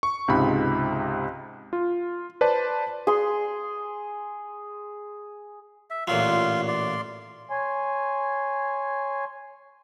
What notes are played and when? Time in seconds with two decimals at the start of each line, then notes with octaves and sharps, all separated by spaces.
0.03 C#6
0.28 C#2 G#2 C3 B5
1.73 F4
2.41 B4 C5 D5 A5
3.07 G#4 C6
5.90 E5
6.08 A1 A#2 F#3 F4 C6
6.68 D5 C6
7.50 C#5 G#5 C6